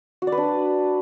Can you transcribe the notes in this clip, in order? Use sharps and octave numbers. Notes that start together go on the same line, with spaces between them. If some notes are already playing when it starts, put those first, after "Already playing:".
F#4
D5
B4
D4